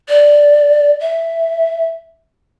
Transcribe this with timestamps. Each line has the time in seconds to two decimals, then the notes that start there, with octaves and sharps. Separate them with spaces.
0.09 D5
1.00 E5